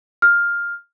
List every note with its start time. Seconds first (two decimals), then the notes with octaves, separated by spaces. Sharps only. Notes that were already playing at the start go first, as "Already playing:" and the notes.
0.22 F6